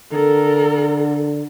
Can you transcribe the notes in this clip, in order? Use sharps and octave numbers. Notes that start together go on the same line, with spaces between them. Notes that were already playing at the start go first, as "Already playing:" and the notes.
D3 A4 A#4